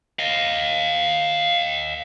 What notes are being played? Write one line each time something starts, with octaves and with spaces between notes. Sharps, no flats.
D#5 F5